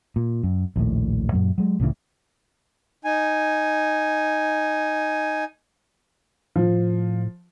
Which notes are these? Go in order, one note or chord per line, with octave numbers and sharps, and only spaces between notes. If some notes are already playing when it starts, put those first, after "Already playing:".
A#2
F#2
A#1 D#2 A2
F#2 A#2 F#3
F#3 G#3
C2 A2 C#3 E3
D#4 G#5
A2 F3